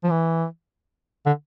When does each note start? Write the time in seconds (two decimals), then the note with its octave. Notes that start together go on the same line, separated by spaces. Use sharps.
0.04 F3
0.10 E3
1.26 D3